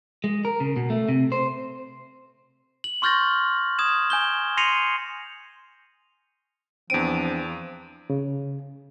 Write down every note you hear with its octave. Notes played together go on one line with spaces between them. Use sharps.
G#3
A#4
C#3
B2
A3
C3
C5
F#7
C6 C#6 F6 G6 A6 A#6
D#6 G#6 E7
G#5 G6 G7
C6 A#6 C7 C#7 D#7 F7
E2 F3 C4 D4 D7 D#7
C#3